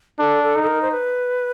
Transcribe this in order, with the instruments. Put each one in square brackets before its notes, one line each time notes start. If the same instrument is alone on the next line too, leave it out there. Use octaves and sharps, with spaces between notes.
[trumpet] D4 [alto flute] A4
[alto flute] A4
[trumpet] D#4
[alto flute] A4
A#4
C5
B4